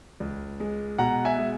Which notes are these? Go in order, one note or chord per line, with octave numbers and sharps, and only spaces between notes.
C#2
G#3
B2 F#5 A#5
E5 G#5
G#3